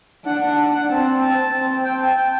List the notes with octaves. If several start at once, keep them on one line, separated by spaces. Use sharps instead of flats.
D4 F#5
F#5
F#5
C4 A5
A5
C4
G5
A5
G5